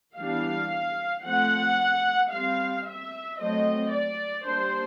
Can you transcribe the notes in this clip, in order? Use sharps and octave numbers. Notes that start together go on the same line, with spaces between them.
E3 G3 B3 D4 F5
F3 A3 C4 F#5
G3 C4 F5
E5
F#3 A3 C4 D#5
D5
G3 A#3 D4 C5